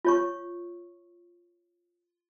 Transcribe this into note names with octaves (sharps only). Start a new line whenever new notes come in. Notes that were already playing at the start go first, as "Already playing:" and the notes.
F4 C#5 C#6